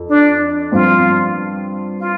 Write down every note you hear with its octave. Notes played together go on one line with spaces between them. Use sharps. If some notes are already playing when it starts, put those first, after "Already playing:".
Already playing: F2
D4
G2 F3 C4 F4
F4